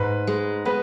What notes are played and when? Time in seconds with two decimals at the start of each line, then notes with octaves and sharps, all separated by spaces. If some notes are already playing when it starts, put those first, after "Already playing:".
Already playing: G#2 B4
0.27 G#3
0.65 B3 B4